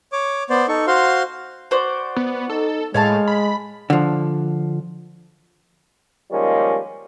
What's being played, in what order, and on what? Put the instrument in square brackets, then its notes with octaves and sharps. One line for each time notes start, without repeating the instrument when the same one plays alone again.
[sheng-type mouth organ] C#5 D6
B3 C5 D5
D#4 A4 C#6
F#4 C5 F5 C6
[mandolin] F#4 C5 D5
[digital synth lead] B3
[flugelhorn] D#4 [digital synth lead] A4
[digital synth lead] A2 [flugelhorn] G#3 [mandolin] C#5 F5 A5
[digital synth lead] B5
[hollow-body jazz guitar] D3 F3
[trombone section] D#3 F3 G3 G#3 A#3 C#4